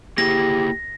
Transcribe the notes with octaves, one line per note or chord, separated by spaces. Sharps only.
A#3 E4 G4 G#4 A#6